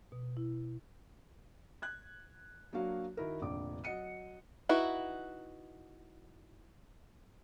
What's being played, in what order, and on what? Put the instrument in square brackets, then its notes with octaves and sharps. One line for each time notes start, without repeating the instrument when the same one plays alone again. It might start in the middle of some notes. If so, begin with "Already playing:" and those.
[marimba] B2
E4
[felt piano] F#6 G#6
F#3 A#3 D4 F#4 F5
D#3 D#4 E4 F#4 A#4
F1 A#1 D3 D6
F#3 D#5 F#5 C#7 D#7
[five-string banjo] D#4 E4 F#4 B4